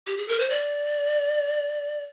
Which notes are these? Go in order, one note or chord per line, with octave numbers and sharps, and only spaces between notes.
G4
G#4
A#4
C5
D5